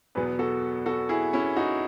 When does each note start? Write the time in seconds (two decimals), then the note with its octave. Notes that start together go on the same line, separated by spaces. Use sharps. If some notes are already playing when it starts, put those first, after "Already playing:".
0.15 E2 B2 F#3 B3 G#4 B4
0.39 F#4 A4
0.86 F#4 A4
1.09 E4 G#4
1.33 C#4 E4
1.56 D#4 F#4